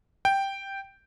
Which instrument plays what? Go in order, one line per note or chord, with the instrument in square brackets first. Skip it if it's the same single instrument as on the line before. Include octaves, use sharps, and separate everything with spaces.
[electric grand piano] G5